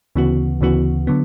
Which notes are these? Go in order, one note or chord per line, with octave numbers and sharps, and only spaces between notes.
D2 C#3 E3 B3 F#4
D2 C#3 E3 B3 F#4
D3 F#3 B3